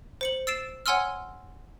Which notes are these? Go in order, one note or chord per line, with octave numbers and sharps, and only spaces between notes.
C5 C#7 F#7
E6 A6 C7 D7 E7
C#5 F#5 G#5 C6 E6 F6